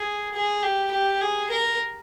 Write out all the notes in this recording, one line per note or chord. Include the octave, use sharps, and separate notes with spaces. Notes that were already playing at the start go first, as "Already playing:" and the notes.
Already playing: G#4
G#4
G4
G4
G#4
A#4